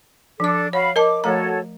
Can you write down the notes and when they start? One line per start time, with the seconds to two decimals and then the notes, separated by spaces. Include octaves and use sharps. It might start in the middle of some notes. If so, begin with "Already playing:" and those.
0.40 F3 D4 A4 D6
0.73 F#4 C#5 F5 B5
0.96 A#4 D#5 A5 D6
1.24 F3 A3 F#4 A4 C#5 A#5